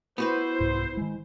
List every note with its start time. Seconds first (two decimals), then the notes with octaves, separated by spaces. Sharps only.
0.18 B3 E4 F#4 B4 C5
0.60 C2 G#2
0.97 D#3 G#3